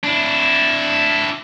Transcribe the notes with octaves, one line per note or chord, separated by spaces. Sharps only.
D4 E4